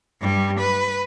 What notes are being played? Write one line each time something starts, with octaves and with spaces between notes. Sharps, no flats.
G2 G3
B4